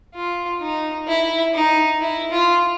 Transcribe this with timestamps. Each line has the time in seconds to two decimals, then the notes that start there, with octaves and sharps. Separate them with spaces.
0.15 F4
0.61 D#4
1.08 E4
1.54 D#4
2.00 E4
2.31 F4